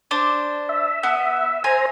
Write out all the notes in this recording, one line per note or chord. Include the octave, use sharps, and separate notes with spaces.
D4 C5
E5
B3
C5 G#5 A#5